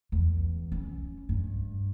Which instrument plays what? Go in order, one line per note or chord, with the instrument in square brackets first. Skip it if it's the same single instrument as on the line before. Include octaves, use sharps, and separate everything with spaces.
[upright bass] E2
C#4
G2